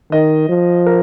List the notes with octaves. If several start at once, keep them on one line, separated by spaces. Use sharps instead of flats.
D#3 D#5
F3
A#4